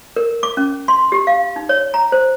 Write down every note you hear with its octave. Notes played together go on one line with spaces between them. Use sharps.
A#4
D6
C#4
C6
G4
F5
D#4
C#5
A#5
C5